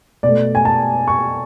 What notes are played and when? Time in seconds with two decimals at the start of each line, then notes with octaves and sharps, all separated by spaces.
0.23 B2 A3 D5
0.55 G#5
0.65 A5
1.08 C#6